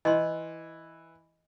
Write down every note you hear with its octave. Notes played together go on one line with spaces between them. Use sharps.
E3 D#5 C6